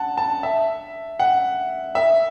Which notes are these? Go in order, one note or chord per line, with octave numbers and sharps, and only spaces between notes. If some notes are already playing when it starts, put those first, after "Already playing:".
Already playing: F#5 A5
A5
E5
F#5
E5